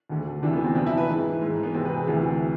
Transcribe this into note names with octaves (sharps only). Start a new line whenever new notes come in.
D2 D3
D2 C3 E3 D4
B3
C4
F2 E3 D4
E4
B4
G#2 E3
G#2 E3
B3
E2 C3 E3 C4
B4
G#4
D2 C3 E3